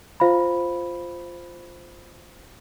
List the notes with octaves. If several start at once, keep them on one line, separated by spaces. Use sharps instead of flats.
F4 C5 F5 B5